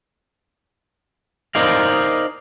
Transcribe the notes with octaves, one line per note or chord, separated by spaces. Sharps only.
D#4 A#4 C5 D5 D#5 F5